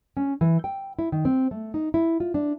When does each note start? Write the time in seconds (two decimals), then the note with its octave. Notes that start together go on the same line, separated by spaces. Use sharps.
0.17 C#4
0.41 E3
0.64 G5
0.99 E4
1.12 D#3
1.25 C4
1.51 A3
1.74 D#4
1.94 E4
2.20 F4
2.34 D4